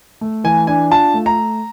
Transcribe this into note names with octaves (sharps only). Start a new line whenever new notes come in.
A3
E3 G#5
D4 G#5
F4 A5
A3
A#5